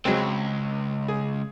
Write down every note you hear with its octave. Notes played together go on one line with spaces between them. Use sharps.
C#2 F#3 G#3 C4
G#4